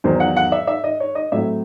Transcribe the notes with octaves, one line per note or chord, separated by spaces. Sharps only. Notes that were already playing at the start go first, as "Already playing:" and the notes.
E2 D#3 F#3 C5
F#5
F#5
E5
E5
D#5
C#5
D#5
A2 F#3 C4 E5